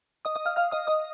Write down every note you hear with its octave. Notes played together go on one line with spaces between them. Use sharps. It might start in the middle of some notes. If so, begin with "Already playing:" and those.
D#5 D#6
D#5 D#6
F5 F6
F5 F6
D#5 D#6
D#5 D#6